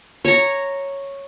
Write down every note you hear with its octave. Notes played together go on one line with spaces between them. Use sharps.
C#5 A#5